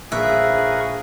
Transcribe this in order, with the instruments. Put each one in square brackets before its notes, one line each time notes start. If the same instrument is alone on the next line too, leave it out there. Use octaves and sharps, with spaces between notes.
[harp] A#1 [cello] G#4 [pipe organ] A#4 B4 C#6 [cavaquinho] E5